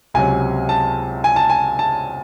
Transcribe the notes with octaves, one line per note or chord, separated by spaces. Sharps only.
C#2 C3 F#3 G#5
A5
G#5
A5
G#5
A5